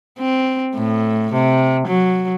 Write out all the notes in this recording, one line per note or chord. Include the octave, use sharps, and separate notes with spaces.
C4
A2
C3
F#3